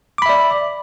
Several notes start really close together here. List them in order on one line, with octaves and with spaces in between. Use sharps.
D6 B5 E5 D5